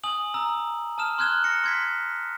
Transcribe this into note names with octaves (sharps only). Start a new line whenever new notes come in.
G#5 D#6 F#7
A#5 D#6 E6
A5 D#6 F6 E7
C6 F6 F#6 G#6 E7 G7
A#6 C#7
C6 G#6 B6